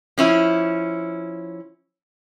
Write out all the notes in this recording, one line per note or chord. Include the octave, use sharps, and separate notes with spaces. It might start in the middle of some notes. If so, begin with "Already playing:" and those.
F3 C#4 E4